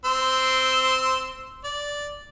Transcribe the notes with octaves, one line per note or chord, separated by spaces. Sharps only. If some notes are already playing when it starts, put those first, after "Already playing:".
C4 C6 E6
D5